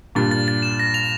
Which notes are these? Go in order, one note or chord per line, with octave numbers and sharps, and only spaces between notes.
G2 A#2 A6
A6
A6
E7
A#6
F7